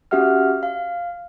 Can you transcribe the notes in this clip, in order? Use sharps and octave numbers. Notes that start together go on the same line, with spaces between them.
C#4 F#4 G4 E5 F#5 F6
F5